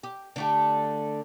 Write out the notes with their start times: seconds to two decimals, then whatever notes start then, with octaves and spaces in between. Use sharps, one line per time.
0.03 G4
0.36 D3 A3 G4